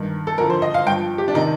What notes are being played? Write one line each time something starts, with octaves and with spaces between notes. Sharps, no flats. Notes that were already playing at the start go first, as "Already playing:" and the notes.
Already playing: G2 D#3
A4
F2 D3 F3 A#4
C5
D#5
F5
G2 F3 G5
G4
D4
C3 D#3 D#4